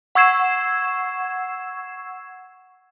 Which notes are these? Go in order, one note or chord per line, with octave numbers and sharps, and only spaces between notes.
F#5 C#6 E6 G#6 C7 E7